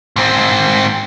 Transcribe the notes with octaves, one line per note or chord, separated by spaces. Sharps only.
G#2 C4